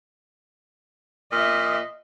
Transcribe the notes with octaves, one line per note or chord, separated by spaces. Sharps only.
A#2 D#5 E5